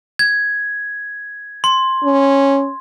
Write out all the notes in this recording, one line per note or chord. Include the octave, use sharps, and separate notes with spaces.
G#6
C6
C#4